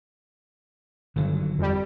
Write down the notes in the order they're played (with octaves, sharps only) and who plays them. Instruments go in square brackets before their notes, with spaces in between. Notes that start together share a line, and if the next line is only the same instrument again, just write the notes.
[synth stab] G1 [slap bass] D3 D#3 F#3
[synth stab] F2 G3